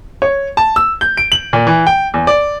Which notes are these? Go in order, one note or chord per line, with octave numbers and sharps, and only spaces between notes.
C#5
A5
E6
G6
D7
F#7
A#2
E3
G5
E2
D5